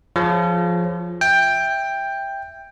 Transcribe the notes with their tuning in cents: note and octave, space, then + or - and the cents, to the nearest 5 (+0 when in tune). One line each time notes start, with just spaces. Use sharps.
F3 +0 G#4 +15 C#5 +0
E5 +0 G5 +10